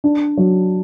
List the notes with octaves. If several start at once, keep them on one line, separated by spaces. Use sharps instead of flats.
D4
F#3